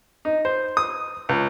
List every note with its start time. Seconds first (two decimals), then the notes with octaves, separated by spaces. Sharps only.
0.25 D#4
0.45 C5
0.77 D#6
1.29 C#2